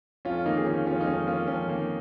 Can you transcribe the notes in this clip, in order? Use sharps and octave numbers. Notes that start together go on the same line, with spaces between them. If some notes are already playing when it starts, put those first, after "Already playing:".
F2 C#4 F4
D#3 A#3 D#4
G#4
D#3 C#4 F4
F2 C#4 F4
D#4
F2 C#4
A#3 C#4 F4
F2 C#4
D#3 A#3